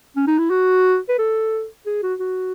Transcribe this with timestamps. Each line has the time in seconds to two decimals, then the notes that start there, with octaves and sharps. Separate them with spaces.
0.16 C#4
0.27 D#4
0.39 E4
0.50 F#4
1.09 B4
1.19 A4
1.86 G#4
2.03 F#4
2.20 F#4